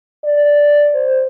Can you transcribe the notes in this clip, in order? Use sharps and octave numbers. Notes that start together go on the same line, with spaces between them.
D5
C5